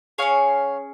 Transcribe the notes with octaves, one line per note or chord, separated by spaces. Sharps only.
C#4 G#4 C#5 F5